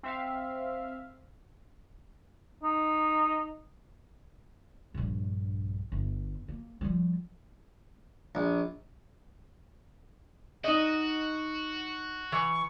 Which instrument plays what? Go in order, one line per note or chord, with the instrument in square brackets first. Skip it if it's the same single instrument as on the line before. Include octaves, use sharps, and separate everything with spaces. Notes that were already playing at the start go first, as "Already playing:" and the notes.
[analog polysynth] C4 E5 F5
[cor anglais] D#4
[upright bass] A#1 G2
G1
A#3
F3 G3
[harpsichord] A#1
[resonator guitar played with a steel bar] D#4 D#5 [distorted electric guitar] F#4
[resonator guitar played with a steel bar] E3 [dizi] C#6